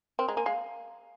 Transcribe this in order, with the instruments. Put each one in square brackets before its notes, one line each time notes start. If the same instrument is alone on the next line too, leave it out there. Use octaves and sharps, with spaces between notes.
[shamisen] C4 [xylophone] A#4
[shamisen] G#3 [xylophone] A#5
[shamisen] A#3 [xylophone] G#5
[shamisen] G#3 [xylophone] F5